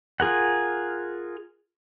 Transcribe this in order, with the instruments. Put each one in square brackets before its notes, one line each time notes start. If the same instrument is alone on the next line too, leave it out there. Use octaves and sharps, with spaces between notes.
[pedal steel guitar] F4 G#4 A#4 F#5